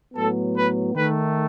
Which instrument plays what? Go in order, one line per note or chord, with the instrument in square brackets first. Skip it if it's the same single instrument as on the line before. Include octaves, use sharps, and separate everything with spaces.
[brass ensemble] A2 F#3 B3 A4
B4
D#3 A3 B4